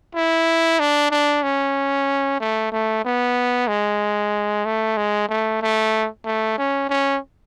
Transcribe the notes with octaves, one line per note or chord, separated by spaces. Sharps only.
E4
D4
D4
C#4
A3
A3
B3
G#3
A3
G#3
A3
A3
A3
C#4
C#4